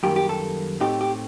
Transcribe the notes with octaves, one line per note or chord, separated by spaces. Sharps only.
F#2 D#3 G3 A#3 G4
G4
A4
A2 A3 C4 D#4 G4
G4